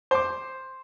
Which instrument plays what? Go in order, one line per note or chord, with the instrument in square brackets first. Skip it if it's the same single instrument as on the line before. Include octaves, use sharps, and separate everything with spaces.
[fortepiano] C5 D6